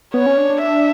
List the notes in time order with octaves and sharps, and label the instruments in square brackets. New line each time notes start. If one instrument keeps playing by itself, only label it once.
[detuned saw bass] B3 [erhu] C#5
[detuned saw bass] C#4
D4
D4
[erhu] E5